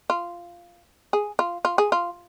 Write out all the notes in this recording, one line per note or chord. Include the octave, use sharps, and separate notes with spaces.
F4
G#4
F4
F4
G#4
F4